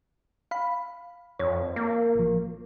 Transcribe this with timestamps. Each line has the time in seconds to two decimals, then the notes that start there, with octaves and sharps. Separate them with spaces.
0.51 F5 B5
1.39 F2 C#5
1.76 A#3
2.15 A1 F3